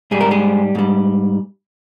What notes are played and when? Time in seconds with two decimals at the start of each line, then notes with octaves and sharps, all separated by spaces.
0.11 G#2 G3 G#4
0.21 A#4
0.31 G#3 G#4
0.75 G#2 G3